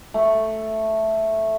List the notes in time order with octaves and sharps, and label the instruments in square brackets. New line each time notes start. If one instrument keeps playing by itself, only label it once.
[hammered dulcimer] A3